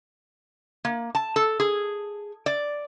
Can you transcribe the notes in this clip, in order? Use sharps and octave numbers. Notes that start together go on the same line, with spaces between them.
A#3
A5
A4
G#4
D5